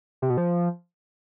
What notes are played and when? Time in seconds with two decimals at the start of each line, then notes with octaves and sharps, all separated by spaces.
0.22 C3
0.30 B2
0.37 F3